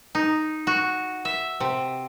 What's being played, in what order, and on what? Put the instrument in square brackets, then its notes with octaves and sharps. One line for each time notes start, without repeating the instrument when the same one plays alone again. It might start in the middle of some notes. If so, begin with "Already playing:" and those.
[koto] D#4
F#4
E5
C3